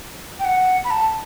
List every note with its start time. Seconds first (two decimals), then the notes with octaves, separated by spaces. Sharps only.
0.39 G5
0.45 F#5
0.84 B5
0.91 A5